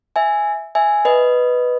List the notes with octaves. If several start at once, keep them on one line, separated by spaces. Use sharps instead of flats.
E5 G#5
E5 G#5
B4 D#5